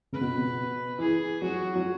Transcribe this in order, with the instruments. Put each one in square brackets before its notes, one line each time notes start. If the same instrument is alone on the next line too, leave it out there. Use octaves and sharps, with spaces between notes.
[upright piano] C#3 [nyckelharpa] B4
[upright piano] B2
B2
[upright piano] E3 [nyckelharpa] G#4
[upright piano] F#3 [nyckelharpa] F#4
[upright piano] F#3